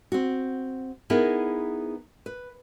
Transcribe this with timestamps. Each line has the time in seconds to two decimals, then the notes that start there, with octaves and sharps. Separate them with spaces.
0.12 C4 F#4
1.10 B3 D#4 E4 G#4 A#4 B4
2.26 B4